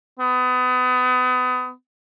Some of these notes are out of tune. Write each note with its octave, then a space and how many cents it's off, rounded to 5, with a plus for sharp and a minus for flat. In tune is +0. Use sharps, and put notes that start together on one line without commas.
B3 +30